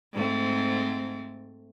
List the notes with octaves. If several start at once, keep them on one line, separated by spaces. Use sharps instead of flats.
G#2 A3 C4